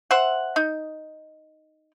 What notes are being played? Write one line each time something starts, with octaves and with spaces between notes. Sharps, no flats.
C5 E5 F#5
D#4